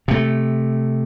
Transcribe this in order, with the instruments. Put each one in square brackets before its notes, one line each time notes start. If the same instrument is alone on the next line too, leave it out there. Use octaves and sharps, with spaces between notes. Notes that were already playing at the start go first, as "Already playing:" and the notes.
[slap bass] C3 A3